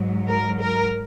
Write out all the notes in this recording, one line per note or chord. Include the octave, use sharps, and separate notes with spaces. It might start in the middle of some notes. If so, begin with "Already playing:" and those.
Already playing: G#2 F#3
A#4
A#4